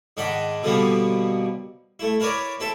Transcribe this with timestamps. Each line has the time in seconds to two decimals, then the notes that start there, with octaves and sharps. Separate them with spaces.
0.17 G#2 D#3 D4 D#5 F#5 B5
0.63 B2 D3 F3 G3 A#3 B3
1.99 A3 E4
2.20 E4 A#4 B4 C#5 D5
2.60 C4 E4 A4 E5